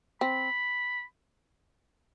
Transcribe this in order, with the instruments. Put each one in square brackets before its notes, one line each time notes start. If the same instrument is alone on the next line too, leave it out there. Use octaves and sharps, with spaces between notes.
[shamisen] C4 [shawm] B5